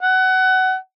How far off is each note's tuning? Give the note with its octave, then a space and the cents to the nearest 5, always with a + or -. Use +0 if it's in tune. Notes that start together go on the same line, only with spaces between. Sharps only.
F#5 +20